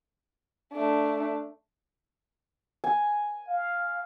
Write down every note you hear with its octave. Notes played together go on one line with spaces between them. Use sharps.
A3 D4
G#5
F5